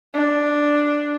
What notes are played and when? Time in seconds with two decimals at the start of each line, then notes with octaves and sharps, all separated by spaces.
0.14 D4